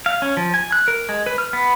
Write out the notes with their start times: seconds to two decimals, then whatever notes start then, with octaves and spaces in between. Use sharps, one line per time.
0.06 F5
0.22 C#4
0.37 F3
0.54 G#5
0.72 F#6
0.88 A#4
1.09 G#3
1.26 B4
1.38 F6
1.53 B3